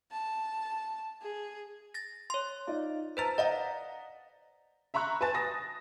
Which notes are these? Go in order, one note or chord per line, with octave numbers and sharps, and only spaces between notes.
A5
G#4
A6 A#6
C#5 C6
D#4 F4 D5
B4 C5 A5 A#5 A6 B6
D5 D#5 F5 F#5 A#5
E5 A#5 B5 C#6 F#6
B4 G#5 A5 A6
D#6 A#6